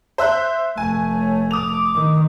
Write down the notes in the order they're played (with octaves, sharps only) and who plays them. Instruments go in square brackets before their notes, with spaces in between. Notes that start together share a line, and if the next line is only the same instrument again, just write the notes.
[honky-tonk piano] C5 E5 F#6
[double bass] F1 A3 [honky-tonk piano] G#5
[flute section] C#5
[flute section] D6 [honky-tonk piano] D#6 F7
[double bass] D#3